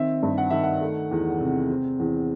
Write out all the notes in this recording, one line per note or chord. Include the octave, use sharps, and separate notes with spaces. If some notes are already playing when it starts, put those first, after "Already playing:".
Already playing: D#3 C4 E5
G2
F#5
D#3 E5
F#5
A3
E2
C3
C4
E2